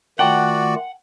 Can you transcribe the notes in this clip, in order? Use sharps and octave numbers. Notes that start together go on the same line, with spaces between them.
D#3 A3 F4 F#4 D5 F#5 G5 A5